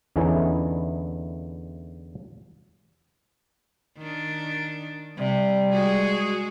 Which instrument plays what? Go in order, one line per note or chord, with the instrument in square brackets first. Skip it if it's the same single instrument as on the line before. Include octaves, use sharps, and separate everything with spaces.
[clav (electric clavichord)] E2 D3 E3 C#4 D#4 E4
[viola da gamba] D#3 D4
[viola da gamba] C3 [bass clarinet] G3
[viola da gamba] G#3 F#4 G#4